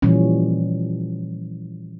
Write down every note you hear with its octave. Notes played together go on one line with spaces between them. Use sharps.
A#2 E3 F3 G3 C#4